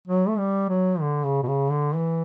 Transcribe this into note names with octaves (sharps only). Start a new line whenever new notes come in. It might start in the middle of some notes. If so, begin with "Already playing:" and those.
F#3
A3
G3
F#3
D3
C#3
B2
C#3
D3
E3